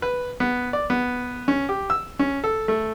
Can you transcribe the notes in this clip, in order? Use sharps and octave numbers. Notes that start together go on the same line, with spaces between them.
B4
B3
D5
B3
C#4
G4
E6
C#4
A4
A3